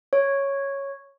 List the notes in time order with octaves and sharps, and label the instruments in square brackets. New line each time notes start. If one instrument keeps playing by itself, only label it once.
[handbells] C#5